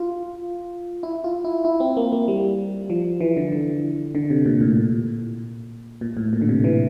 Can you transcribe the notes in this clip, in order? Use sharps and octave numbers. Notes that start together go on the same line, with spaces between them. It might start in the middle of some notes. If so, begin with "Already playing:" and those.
Already playing: F4
E4
F4
E4
E4
C4
A#3
A#3
G3
F3
E3
D3
D3
D3
C3
A#2
A2
A#2
A#2
A2
A#2
D3
C3
E3